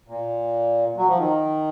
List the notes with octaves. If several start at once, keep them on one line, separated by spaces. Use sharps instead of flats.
A#2
F#3
F3
D#3